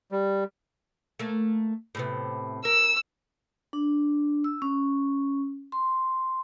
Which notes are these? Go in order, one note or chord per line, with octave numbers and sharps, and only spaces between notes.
G3
A3 A#3
A2 C3 B3
A#4 E6
D4
E6
C#4
C6